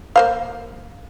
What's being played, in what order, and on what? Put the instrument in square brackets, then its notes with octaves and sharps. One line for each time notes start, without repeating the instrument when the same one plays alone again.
[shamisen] A#3 C5 F5